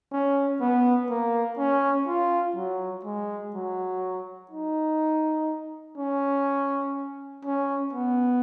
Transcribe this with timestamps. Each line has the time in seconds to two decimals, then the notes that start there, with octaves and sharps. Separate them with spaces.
0.12 C#4
0.60 B3
1.10 A#3
1.58 C#4
2.07 F4
2.56 F#3
3.04 G#3
3.54 F#3
4.51 D#4
5.97 C#4
7.45 C#4
7.93 B3